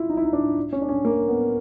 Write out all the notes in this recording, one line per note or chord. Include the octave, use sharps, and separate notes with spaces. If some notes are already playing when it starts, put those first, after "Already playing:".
Already playing: E4 F4
D#4
E4
D#4
D4
C#4
D4
C#4
A#3
B3